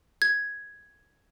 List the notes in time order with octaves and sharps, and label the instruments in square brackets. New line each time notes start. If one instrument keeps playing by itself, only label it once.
[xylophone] G#6